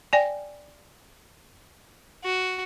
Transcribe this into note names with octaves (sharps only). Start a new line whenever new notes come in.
D5 G5 G#5
F#4